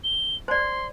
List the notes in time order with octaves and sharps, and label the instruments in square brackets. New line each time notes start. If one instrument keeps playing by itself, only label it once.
[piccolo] G7
[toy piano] C5 D5 [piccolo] C6